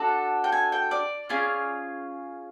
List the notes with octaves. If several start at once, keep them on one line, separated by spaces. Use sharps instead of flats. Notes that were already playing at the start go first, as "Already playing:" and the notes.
Already playing: D4 F#4 A4 A5
G5
G#5
G5
D5
C#4 F4 G#4